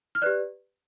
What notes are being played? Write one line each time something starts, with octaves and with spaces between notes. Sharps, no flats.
F6
G4 B4 D5 F#6